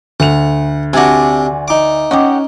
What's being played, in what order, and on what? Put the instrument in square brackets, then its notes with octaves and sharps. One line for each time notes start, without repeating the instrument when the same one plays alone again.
[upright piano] D2 F7 [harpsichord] F#5
[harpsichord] C3 D4 [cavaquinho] F#4 D5 G#5
[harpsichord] D#4 D6
[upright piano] C#4 [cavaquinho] G4 D#5 F#5